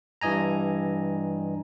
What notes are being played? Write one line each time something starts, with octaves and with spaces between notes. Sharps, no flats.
G2 E3 D#5 G#5 A#5